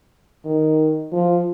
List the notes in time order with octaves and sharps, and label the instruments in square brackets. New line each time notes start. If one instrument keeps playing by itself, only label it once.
[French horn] D#3
F3